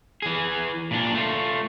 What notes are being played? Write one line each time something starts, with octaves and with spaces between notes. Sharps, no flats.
E3 G#4
A#2 D4
A3 F4